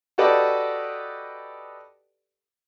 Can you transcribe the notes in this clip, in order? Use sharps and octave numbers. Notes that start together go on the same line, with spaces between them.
F#4 G4 A4 B4 D5 D#5